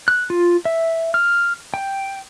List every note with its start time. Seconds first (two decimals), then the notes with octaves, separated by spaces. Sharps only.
0.08 F#6
0.30 F4
0.65 E5
1.14 F6
1.74 G5